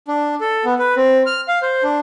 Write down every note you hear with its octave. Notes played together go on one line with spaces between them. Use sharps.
D4
A4
B3
B4
C4
F6
F5
C5
D4